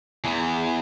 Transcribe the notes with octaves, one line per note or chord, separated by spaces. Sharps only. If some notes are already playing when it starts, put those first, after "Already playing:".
E2 E3